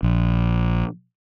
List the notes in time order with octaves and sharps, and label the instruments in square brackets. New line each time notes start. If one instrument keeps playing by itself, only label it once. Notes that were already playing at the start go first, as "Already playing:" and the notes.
[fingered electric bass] A#1